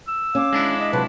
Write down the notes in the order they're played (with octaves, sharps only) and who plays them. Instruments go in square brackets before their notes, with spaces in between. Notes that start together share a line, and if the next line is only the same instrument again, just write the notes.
[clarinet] E6
[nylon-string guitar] C#4 [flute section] F5 D6
[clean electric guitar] G#3 D4 E4
[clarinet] D#5
[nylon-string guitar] C3 F#3 A5 [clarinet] B4